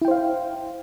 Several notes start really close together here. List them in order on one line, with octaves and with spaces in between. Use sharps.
E4 G5 C5 F5